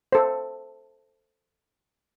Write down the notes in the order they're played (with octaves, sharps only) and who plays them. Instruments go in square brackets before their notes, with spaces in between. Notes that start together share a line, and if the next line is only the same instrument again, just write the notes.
[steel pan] A4 C5